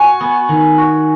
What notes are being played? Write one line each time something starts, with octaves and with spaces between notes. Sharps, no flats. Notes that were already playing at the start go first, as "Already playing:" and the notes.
Already playing: F#4 G#5
B3
D#3
F#4